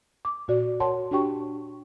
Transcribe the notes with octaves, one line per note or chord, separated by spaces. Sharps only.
D6
A#2 F#4 D5
F#4 A#4 C#5 F#5 A5 C6
D4 F#4 G4 G5 C#6